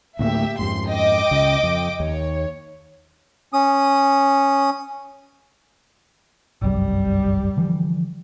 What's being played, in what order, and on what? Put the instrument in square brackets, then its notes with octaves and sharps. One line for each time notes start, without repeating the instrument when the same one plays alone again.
[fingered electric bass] D2 A2 A#3 [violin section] G4 E5
[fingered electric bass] F2 G#2 [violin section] C6
[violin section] D#5 G5 D6
[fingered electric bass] C#2 C#3
F2
[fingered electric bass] D#2 [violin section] C#5
[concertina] C#4 D#6
[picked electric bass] G1 C2 F#2 [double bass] G3
[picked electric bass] D3 E3 F3